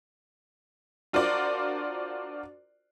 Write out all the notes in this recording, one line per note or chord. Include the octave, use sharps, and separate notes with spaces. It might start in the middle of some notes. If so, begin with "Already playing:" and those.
D4 F4 F#4 A#4 C5 D5